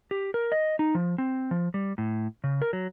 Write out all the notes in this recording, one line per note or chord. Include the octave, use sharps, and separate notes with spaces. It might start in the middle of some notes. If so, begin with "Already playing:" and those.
G4
A#4
D#5
D#4
F3
C4
F3
G3
A2
C#3
A#4
F#3